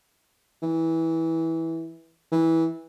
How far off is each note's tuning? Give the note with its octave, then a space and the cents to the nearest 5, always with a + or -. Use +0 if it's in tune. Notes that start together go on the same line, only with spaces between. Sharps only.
E3 -15
E3 -15